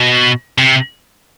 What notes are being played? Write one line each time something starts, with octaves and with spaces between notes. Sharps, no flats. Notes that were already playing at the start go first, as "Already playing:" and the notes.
Already playing: B2
C3